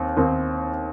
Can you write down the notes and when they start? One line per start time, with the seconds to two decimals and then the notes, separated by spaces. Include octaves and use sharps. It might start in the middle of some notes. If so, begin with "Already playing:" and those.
Already playing: D#2 C4
0.17 D#2 D#3 C4